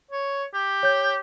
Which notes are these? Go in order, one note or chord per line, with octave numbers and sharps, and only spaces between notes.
C#5
G4
C#5 G6